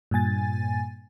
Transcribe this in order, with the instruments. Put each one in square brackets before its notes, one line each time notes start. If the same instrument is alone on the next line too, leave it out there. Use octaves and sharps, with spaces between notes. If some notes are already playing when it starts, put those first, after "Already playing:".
[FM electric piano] G2 A#2 G#5 A6